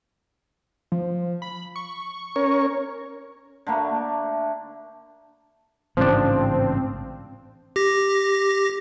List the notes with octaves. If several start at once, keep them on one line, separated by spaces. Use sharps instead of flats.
F3
B5
C#6
C#4 A#4 C#5
D3 A3 A#3
A1 G#2 C#3 F3 C4 D4
G4 A#6